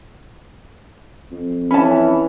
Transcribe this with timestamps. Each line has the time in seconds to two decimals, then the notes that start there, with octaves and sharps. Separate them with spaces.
1.31 F2
1.71 E3 C#4 C#5 A5 B5